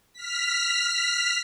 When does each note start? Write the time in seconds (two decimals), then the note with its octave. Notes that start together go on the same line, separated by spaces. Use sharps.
0.13 F6 B6